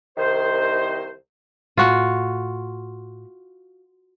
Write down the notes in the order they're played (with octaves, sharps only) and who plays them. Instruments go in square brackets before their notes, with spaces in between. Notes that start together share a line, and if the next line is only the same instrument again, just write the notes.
[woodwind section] C2 D#3 C5
[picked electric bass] A2 [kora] F4 F#4